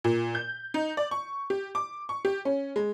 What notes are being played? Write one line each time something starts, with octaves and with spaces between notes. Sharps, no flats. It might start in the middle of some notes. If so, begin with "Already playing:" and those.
A#2
G6
D#4
D5
C#6
G4
D6
C#6
G4
C#4
G#3